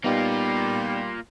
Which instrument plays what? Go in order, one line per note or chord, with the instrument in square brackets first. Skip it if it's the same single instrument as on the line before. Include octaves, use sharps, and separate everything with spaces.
[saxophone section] G3 [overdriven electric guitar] A#3 F4 [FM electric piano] B3 D#4